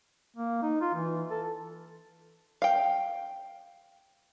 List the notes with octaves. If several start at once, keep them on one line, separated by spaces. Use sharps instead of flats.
A#3
D#4
F4
E3
A4
F5 G5